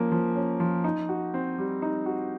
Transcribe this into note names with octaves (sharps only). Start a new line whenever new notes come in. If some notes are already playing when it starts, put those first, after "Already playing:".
Already playing: F3 A#3 C#4
F3
C#4
F3
D#4
F#4
C4
G3
D#4
F#4